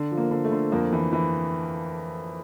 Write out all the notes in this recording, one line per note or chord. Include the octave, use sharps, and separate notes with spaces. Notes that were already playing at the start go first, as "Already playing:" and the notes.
Already playing: D3
F3
A#3
D3
A3
D3
F2 A#3
E3
E3